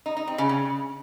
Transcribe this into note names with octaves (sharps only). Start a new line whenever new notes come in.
D#4
D#4
C4
C#3
C#3